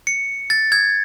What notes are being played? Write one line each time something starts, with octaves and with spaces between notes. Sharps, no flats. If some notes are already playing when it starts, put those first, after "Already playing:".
C#7
A6
G#6